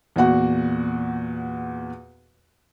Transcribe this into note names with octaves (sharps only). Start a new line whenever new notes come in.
E2 A#2 F#4 F#5